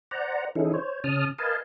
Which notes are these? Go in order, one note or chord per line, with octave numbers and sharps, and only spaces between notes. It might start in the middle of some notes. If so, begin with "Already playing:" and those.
C5 D5 F#5 A#5
E3 C#4 D#4 E4 G#4 A4
C5 C#5
C#3 C#4 A5 D#6 F6
A#4 B4 D#5 F5 G#5 A5